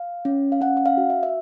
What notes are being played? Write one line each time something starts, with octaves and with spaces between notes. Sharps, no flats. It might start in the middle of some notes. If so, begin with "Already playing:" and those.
Already playing: F5
C#4
F5
C#4 F#5
F#5
F5
F#4
E5
E5